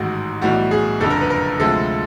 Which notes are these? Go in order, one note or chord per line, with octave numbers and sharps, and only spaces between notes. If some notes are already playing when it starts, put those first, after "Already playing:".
Already playing: A1 G#2 D#3 F#4
B1 A2 E3 G3 F#4
G#4
F#1 F2 D3 G3 A4
A#4
B4
A#4
D2 C3 F3 G#3 A4